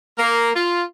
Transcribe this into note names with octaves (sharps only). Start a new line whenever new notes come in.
A#3
F4